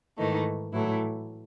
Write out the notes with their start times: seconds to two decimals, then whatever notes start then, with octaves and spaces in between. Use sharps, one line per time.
0.18 G#2 D#3 E3 A3 D#4
0.72 A2 E3 F#3 A3 E4